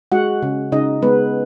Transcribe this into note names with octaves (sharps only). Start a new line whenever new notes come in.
G#3 F#4 F#5
C#3
C#3 D#4 D#5
G#3 B3 B4